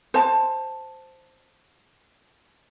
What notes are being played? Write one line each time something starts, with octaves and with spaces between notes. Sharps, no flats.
C5 A5